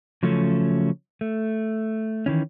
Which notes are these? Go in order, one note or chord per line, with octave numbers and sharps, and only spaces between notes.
C#3 F3 F#3 A3 C#4
A3
D#3 E3 C#4